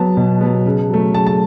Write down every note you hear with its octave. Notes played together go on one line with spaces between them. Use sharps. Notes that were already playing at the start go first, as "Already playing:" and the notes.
Already playing: F#3 B3 A5
B2
F#3 B3
C#3
F#3 A3
C#3 A5
A5